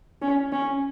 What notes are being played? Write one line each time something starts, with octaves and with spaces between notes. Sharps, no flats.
C#4
C#4